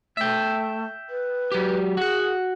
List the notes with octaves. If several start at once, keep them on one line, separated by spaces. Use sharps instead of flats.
A3 E5 G5
B4
F#3 G4
F#4 G#4 F#5